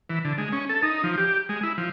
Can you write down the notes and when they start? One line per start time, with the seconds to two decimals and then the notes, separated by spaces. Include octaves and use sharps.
0.09 E3
0.25 D3
0.38 G#3
0.53 C#4
0.69 A4
0.83 D#4
1.04 F3
1.17 G4
1.49 G#3
1.63 E4
1.78 F3